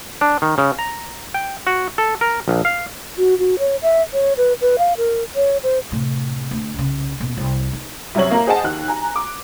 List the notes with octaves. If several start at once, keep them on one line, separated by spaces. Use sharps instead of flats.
D4
D#3
C#3
A#5
G5
F#4
A4
A#4
A#1
F5
F#4
F#4
C#5
E5
C#5
B4
B4
F5
A#4
C#5
C5
A2 C3
D2
C2 C#3
D#1 B2
C2
D#4
C2 F#2 C3 C#5 F#7
A#3 A#4
G#4 C5 D#5 F#5 G#5 A5
D#2 D#3 F#6
G#5 A#5
D6